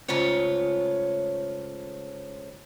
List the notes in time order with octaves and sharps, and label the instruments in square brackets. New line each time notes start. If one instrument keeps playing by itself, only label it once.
[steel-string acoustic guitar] G#2 C#3 A3 F4 C#5